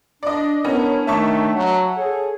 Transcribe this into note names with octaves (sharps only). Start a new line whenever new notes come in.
D4 D5 D#5
B3 C#4 D4 E4 A#4 C#5
D#3 A3 E5 A5 C#6
F#3 F#5
G#4 A4 C#5